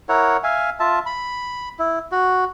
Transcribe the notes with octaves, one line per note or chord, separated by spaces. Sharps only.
E4 A#4 C#5 F#5
E5 F5 G#5
F4 E5 A5
B5
E4
F#4